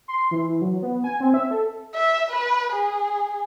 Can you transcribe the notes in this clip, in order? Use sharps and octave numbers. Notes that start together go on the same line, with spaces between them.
C6
E3
F#3
B3
G#5
C4
E5
A4
E5
B4
G#4